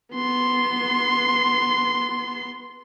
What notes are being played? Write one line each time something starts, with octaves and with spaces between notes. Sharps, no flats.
B3 C6